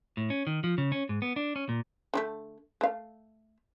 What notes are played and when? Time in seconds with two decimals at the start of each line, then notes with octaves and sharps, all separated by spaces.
0.17 A2
0.30 C#4
0.47 D#3
0.64 F3
0.78 C#3
0.92 C#4
1.09 G#2
1.22 B3
1.36 D4
1.56 C#4
1.69 A#2
2.14 D3 G3 A3
2.81 A3 F5